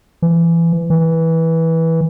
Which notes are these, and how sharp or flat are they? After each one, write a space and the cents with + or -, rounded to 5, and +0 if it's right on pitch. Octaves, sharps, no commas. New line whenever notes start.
E3 +25
E3 -15